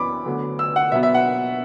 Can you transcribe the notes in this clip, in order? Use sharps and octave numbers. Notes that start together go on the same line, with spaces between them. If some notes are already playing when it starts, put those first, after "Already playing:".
Already playing: F#2 E3 B3 B5 D6
D2 D3 F#3 B3
E6
F#5
B2 F#3 B3 E5
E5
F#5